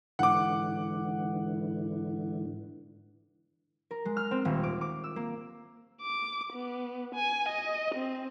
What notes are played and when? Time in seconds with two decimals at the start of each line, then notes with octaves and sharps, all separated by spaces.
0.19 G#2 D3 E3 F#5 D6
3.91 A#4
4.05 G#3
4.17 F6
4.31 C4
4.45 D#1
4.63 D6
4.81 D6
5.04 E6
5.16 A#3
6.02 D6
6.53 B3
7.15 G#5
7.48 D#5
7.94 C4